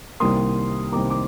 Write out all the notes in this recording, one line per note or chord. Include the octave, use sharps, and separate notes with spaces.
C2 C3 D#3 G3 A#3 C6 D#6
C2 C3 D#3 G3 A#3 A#5 D6
D6